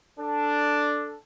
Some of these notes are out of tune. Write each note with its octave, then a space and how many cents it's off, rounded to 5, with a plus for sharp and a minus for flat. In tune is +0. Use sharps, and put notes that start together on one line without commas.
D4 +0 A4 +0